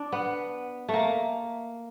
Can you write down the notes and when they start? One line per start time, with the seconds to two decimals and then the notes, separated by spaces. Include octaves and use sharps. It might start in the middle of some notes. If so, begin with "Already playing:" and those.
Already playing: D4
0.12 B3
0.89 A3
0.94 A#3